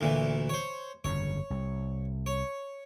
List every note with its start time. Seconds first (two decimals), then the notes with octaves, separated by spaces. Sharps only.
0.01 D2 A#2 E3
0.49 C5 C#5
1.04 G1 F2 C#3 C#5
1.50 C2
2.26 C#5